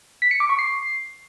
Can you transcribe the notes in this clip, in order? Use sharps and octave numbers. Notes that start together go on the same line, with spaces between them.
B6
C#7
D6
C#6
C7